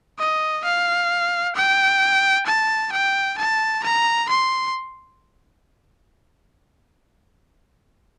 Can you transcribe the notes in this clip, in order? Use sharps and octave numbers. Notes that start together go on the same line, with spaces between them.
D#5
F5
G5
A5
G5
A5
A#5
C6